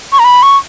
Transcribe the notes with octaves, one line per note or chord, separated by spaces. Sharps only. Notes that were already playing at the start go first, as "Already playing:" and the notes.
C#6
A#5
B5
C#6